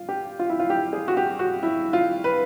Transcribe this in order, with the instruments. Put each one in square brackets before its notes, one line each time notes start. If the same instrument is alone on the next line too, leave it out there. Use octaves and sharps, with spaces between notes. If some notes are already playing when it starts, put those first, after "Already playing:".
Already playing: [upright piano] F4
G4
F4
E4
F4
G4
G#4
F#4
G4
F#4
E4
F4
B4